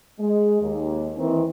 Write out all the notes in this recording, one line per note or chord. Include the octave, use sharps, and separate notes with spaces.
G#3
D#2
D#3 E3 C4